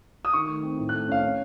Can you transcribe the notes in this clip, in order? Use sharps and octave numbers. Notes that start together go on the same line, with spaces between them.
D#6
D#3 C#6
A3
C4
A2
F#6
A3
C#4 F5
C#4